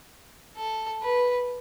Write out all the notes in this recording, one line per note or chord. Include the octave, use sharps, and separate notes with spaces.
A4
B4